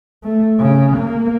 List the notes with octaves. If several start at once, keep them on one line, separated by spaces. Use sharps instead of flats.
A3
C#3
A#3